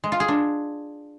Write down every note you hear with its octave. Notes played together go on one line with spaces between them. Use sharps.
G#3
F4
G#4
D4